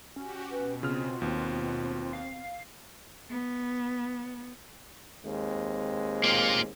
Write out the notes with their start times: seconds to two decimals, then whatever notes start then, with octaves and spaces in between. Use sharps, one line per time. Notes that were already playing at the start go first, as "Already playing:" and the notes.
0.16 C#4 F#4 G4
0.52 B2 B4
0.83 C#3 C4 F4 F6
1.22 D#2 C4
2.13 F5
3.31 B3
5.25 D#2 G#3 C4
6.24 A#3 F4